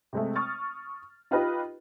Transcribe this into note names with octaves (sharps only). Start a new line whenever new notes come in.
C3 G#3 A3
C#6 D#6 F6 A6
D#4 F4 G4 B4 D#5